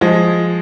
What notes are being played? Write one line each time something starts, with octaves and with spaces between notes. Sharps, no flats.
F3 G#3